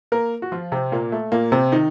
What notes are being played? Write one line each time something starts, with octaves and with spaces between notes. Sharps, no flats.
A#3 A#4
F#4
F3 F4
C3 C4
A#2 A#3
A3
A#2 A#3
C3 C4
D#3 D#4